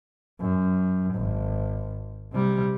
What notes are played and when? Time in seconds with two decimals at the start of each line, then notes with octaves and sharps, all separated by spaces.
0.40 F#2
1.14 G#1
2.33 C3 G3